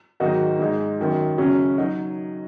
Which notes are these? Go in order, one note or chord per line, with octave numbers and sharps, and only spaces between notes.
G#2 D#3 F#3 D#4 F#4
G#2 G#3 D#4
F#2 D#3 F#3
F#2 C#3 F#3 C#4
F#3 D#4 F#4